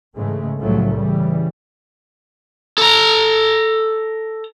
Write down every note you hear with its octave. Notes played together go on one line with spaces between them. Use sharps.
G#2 C#3 E3 G#3 A3
C2 A2 C#3 F3 F#3 A3
C#3 E3 G3
A4 A#5